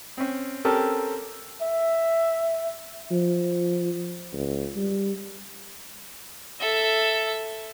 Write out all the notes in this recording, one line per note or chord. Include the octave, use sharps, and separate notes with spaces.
C4 C#4
C4 C#4 G4 A4 A#4
E5
F3
C#2
G3
A4 E5